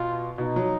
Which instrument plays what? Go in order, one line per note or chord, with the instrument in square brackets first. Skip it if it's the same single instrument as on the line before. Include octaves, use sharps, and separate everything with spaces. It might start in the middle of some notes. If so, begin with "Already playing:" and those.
Already playing: [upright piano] B2 [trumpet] F4
[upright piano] B2 [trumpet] D#4
[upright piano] F#3